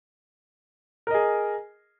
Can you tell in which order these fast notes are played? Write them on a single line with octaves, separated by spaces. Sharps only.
A#4 D#5 G#4